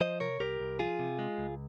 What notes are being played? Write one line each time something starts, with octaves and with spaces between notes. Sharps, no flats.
F3 C5 D#5
C3 A#4 C#5
C2 G4 A#4
C2
F3 F4 G#4
C3
G#3
C#2